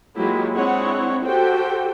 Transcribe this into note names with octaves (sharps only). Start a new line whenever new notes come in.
F#3 G#3 A#3 E4 F4 G4
G#3 C4 D4 E4 C#5 F#5
F#4 G4 A4 C5 G5